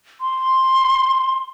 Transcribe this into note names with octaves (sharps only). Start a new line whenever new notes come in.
C6